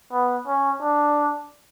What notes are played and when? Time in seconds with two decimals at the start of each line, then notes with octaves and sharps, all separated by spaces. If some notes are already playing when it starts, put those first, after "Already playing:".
0.12 B3
0.47 C#4
0.82 D4